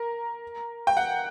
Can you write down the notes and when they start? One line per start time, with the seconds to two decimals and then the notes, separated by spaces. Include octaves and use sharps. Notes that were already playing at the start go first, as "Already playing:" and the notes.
Already playing: A#4
0.87 G5
0.97 F#5